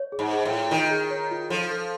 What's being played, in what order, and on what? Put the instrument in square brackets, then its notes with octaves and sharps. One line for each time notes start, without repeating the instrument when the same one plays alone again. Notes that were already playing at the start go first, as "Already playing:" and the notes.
Already playing: [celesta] C#5
G#4
[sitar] G#2
[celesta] G#4
[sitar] A2
[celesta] F4
[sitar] D#3 [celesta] F4
[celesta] G#4
C#5
F4
[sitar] F3 [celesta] A4
[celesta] A4